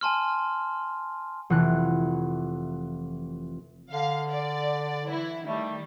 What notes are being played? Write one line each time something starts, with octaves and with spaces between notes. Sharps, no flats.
G#5 A5 C6 F6
F1 E3 F#6
D3 F5
D5
E3 E4
D#3 G3 A3